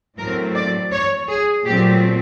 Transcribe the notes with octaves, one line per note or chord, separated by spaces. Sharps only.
A2 F#3 A3 C4 A#4
D5
C#5
G#4
A#2 F#3 A3 C4 G4